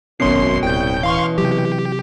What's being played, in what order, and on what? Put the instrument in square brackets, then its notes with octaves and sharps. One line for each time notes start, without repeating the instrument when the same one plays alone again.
[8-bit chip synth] G#1 C6 C7 [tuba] F#2 [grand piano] B2 C#4
[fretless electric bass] D1 [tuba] C2 [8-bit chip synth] G5 G6
[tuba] E3 [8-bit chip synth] F5 C6 C#6
[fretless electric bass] C3 F#3 [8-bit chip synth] G4